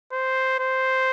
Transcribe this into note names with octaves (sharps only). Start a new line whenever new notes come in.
C5
C5